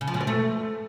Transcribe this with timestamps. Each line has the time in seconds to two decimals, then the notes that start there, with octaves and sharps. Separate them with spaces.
0.01 C#3
0.07 F3
0.14 B2
0.21 C4
0.27 A3